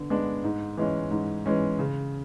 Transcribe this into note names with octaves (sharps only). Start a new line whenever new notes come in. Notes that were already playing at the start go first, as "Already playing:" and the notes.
Already playing: D3 B3
G#3 B3 D4
G#2
E3 G#3 C#4
G#2
E3 G#3 C#4
C#3